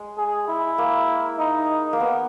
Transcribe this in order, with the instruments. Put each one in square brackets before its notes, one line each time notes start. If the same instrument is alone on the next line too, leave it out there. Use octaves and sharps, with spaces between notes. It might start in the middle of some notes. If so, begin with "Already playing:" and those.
Already playing: [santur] G#3
[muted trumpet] G#4
E4
[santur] A#3
[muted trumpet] D#4
[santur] A#3
B3